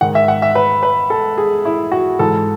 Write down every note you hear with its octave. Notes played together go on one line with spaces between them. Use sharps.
G#2 D#3 F#5
E5
F#5
E5
B4
B4
A4
G#4
E4
F#4
G#2 E3 A4